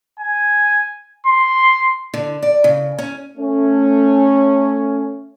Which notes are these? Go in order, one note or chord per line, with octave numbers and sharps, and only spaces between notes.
G#5
C6
D3
D5
C#3
C#4
A3 C#4